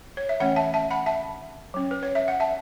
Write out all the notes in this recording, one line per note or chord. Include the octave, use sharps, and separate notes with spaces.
C#5
E5
E3 A3 C#4 C#5 F#5
E5 A5
E5 A5
F#5 B5
E5 A5
F#3 C#4
B4
C#5
E5
F#5
E5 A5